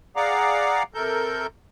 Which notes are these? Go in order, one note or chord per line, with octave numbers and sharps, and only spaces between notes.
G#4 D5 F5 F#5 A#5 D6
C3 A4 A#4 G6